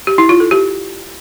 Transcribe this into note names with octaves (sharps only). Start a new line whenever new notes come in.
G4
E4
F4
A4
G4